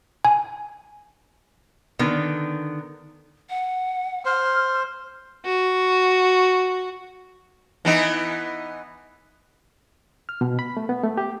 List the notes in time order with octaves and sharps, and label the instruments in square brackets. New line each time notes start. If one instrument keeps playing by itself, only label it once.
[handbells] G#5
[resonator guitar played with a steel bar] D3 D#3 B3
[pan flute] F#5
[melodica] C5 [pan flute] F6
[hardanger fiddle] F#4
[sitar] E3 B3 D#4
[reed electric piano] F6
B2
B5
A3
B3
A3
G4